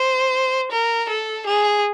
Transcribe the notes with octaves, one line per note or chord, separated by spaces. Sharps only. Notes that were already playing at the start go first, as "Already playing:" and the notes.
Already playing: C5
A#4
A4
G#4